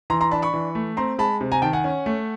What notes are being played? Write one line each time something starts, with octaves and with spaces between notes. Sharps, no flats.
E3 A#5 C6
A#5 C6
D4 A5 B5
B5 C#6
E3
A3
C4 A#5 C6
G#3 A5 B5
C3
G#5 A#5
D#3 G5 A5
F#5 G#5
C#4
A3